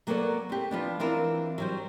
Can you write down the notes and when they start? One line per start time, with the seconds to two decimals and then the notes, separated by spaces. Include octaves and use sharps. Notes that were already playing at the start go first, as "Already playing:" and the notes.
0.07 F#3 A#3 B3 F#4 A4 D5
0.49 C4 G4
0.71 F3 B3 D4
1.00 E3 C4 D4 F4 A#4 E5
1.58 F#3 G3 C5